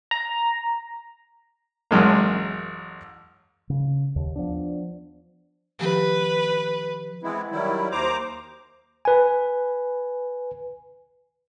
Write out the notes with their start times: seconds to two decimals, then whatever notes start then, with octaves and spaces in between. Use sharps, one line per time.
0.11 A#5
1.91 A1 F#2 G#3 A#3
3.70 C#3
4.16 D#2
4.36 F3 B3 D4
5.79 D#3 F3 G4 B4
7.23 E3 G#3 B3 C4 E4
7.51 D#3 F#3 G3 E4
7.91 D#2 C5 A#5 D6
9.05 B4 G#5